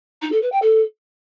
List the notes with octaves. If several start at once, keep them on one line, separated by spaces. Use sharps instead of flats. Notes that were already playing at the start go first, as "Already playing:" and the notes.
D#4
A4
B4
G5
A4